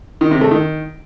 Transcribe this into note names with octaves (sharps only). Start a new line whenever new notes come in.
D#3
C3
A3
D#3